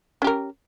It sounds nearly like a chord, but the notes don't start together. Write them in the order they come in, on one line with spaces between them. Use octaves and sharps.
C#4 G4 A#4